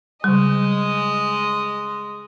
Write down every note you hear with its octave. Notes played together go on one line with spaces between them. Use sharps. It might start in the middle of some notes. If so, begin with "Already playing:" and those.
C#3 G3 G#3 D#5